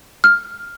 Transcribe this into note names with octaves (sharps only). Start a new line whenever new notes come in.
F6